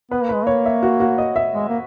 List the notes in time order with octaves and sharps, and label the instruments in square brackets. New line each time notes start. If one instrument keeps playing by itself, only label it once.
[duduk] B3 [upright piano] B4
[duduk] A#3
[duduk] G#3 [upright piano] B4
[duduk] A#3 [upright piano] C#5
[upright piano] E5
F#4
F#4
D#5
E5
[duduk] G#3
A#3